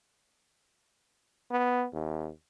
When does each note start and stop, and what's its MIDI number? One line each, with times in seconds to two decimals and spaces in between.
1.51 1.86 59
1.92 2.30 39